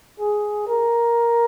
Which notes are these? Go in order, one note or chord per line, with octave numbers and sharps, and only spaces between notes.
G#4
A#4